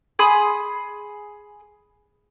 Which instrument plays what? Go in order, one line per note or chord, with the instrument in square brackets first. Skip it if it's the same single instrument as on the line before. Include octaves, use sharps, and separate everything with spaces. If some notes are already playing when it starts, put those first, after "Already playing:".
[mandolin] G#4 B5 C6 D#6